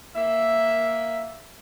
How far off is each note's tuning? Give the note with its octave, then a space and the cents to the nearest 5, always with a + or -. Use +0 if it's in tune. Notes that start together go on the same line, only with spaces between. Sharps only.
A#3 +0 E5 +0